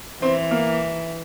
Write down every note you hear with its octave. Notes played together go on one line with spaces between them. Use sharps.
E3 C4
A#3